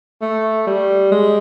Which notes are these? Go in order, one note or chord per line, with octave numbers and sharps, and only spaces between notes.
A3
G3
G#3